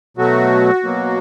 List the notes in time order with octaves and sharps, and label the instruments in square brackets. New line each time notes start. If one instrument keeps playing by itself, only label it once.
[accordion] B2 F#3 A3 F#4
B2 F#3 A#3